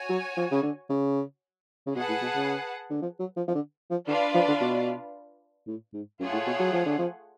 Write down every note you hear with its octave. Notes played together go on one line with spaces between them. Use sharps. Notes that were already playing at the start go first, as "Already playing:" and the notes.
Already playing: F#4 C#5 G#5
F#3
F3
C#3
D3
C#3
C#3
B2 G#4 B4 F#5 A5
A2
B2
C#3
D3
F3
F#3
F3
F3
D3
F3
D3 D4 F4 B4 D5 F5
F3
D3
B2
A2
G#2
F#2 A3 F4 G#4 C#5 F#5
A2
B2
F#3
F3
D3
F3